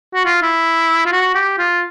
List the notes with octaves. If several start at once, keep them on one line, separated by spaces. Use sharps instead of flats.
F#4
F4
E4
F4
F#4
G4
F4